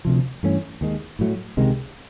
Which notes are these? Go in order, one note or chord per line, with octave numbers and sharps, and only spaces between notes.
D2 C3 F3
G2 E3 A3 C#4
D#2 D#3 G#3
A2 F#3 A3
C#2 C3 D#3 G#3